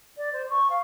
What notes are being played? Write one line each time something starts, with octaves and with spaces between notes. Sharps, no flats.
D5
C5
C#6
F5